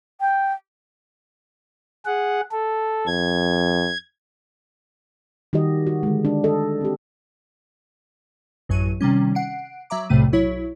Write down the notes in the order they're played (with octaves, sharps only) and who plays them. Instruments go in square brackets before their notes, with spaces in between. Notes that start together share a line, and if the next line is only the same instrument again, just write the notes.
[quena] G5
[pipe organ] G#4 F#5
A4
[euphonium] F2 [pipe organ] G#6
[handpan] D#3 G3 F#4 G4 D#5
F#4
D3 G#3
D4
A4 D#5
C4 G4
[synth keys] A1 F#2 F#3 C#6 D#7
C3 D#3 G3 C#4
F#5 C7 D7
F#3 E5 A#5 D6
B1 F2 A2 C3 A3 D#7
B1 F#3 E4 C#5